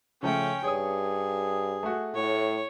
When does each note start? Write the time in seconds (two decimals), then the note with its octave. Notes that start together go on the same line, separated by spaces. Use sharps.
0.23 C#3 F3 A3 C#4 G5
0.64 G2 G#4 C#5 D#6
1.83 A3 F#4
2.14 A2 C#5